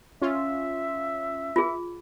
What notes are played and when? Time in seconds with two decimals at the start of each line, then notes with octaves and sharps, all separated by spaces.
0.22 C#4 F4 E5
1.56 F4 G#4